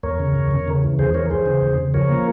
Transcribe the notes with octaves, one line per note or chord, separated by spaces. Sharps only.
E2 A#4 C#5
C#3
E2
E2
C#3
E3
E2 G#4 C5
E3 A#4 C#5
E3 G#4 C5
C#3
E2
C#3
F3 A#4 C#5
A#3